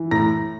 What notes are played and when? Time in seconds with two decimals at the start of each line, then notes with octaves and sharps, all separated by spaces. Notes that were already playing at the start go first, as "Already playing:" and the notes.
Already playing: E3
0.11 A2 A#5 A#6